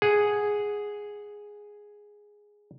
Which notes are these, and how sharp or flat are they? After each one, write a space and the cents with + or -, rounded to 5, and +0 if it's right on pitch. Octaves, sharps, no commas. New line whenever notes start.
G#4 +0 F#5 +0